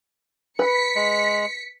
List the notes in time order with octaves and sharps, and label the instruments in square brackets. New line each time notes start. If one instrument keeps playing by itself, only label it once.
[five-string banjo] B4 [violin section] B6 C#7
[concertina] G#3